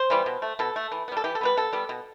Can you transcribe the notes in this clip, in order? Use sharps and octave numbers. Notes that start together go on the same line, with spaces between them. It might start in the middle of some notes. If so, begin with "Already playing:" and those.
Already playing: C5
E3 G3 B3
B2
A3
B2 A4
A3
E3
B3
G3 A4
E3 G4
A4
G3 B3 B4
B2 A4
G3 B3
B2